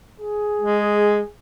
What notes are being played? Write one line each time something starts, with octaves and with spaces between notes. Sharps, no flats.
G#4
G#3